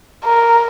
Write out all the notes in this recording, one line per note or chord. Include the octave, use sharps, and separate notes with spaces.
A#4